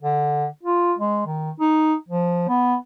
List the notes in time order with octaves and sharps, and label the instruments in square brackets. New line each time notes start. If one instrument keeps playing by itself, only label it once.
[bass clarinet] D3
F4
G#3
D#3
D#4
F3
B3